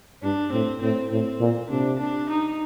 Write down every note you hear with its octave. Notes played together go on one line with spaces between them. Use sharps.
G2 D4
A2 C4
A2 C4
A2 C4
A#2
C3 D4
D4
D#4